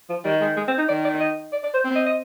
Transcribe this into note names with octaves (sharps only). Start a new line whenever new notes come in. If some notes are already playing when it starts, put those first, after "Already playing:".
F3
D#3 G3
G#3
G#3
C4
D#4
D#3 D5
D5
D#5
D5
D5
C5
C4
D#5
D#5